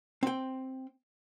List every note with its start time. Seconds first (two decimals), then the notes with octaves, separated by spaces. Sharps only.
0.23 C4 G5